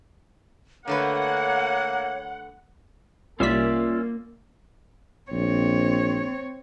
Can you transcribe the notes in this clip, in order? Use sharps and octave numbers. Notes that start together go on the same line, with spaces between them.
D3 A3 A#3 B4 C#5 F#5
C2 G3 A#3 C#4 F4 D5 E5 B6
A#1 C4 C#5